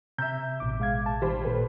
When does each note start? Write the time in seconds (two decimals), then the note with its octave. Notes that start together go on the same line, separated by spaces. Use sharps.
0.18 C3 E5 A#5 E6 G6
0.60 A1 B2 D6
0.80 G#3 F5 G#6
1.06 A5
1.22 D#3 G3 C5
1.45 A#2 A4 B4